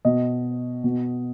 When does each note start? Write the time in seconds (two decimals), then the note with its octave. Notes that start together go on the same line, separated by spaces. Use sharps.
0.05 B2 D#5
0.84 B2